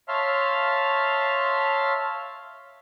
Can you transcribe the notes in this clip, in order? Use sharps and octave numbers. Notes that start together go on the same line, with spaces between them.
C#5 E5 F5 A5 C6 F6